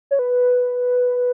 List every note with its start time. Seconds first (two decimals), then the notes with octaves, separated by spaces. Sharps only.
0.11 C#5
0.19 B4